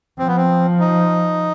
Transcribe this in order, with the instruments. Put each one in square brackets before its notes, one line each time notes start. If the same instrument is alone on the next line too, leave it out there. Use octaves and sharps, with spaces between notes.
[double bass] F3 [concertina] C4
[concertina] B3
C4
D#4